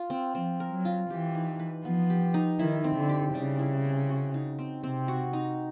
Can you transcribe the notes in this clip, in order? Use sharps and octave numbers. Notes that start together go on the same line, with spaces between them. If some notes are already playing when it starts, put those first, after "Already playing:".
Already playing: F4
C4
F3 C4
A#4
F#3
F4
E3 G4
D#4
B4
F3 B3
G4
D#4
D#3 E4
C4
D3
G4
C#3 G3
E4
C4
F#4
D#4
C4
C3 C4
F#4
D#4